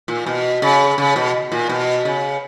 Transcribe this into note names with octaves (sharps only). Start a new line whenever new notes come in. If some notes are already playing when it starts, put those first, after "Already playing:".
A#2
B2
C#3
C#3
B2
A#2
B2
C#3